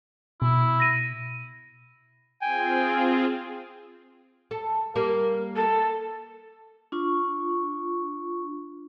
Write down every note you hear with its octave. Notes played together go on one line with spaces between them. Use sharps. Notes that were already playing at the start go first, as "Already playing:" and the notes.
B2 E4
A#6 D#7
C4 F4 G#4 G5 G#5
A4
G3 A#3
A4
D4 F4 C#6